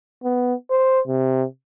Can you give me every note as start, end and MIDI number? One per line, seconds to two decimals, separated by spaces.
0.24 0.54 59
0.71 1.00 72
1.08 1.44 48